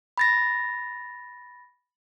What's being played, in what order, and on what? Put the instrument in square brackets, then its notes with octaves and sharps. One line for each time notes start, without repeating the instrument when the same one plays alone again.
[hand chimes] B5 A6 A#6